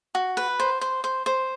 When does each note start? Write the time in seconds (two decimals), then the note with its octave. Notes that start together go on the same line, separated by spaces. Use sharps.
0.15 F#4
0.37 B4
0.60 C5
0.81 C5
1.04 C5
1.26 C5